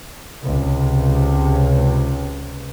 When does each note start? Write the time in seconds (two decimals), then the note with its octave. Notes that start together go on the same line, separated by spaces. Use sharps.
0.44 C#2 C3